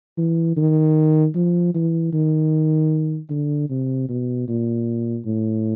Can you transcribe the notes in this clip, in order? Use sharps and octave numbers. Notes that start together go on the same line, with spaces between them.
E3
D#3
F3
E3
D#3
D3
C3
B2
A#2
A2